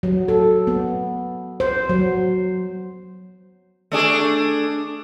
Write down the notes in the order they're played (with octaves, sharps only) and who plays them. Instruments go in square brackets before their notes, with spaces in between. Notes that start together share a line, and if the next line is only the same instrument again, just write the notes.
[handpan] F#3
A4
B3
C5
F#3
[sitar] A3 D4 G#4